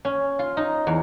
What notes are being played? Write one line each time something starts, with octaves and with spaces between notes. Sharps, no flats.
C#4
F4
D#4
E2